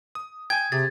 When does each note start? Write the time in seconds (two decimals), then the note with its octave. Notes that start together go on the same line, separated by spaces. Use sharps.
0.15 D#6
0.50 G5 G#5 G#6
0.72 C3 G4 G#4 A6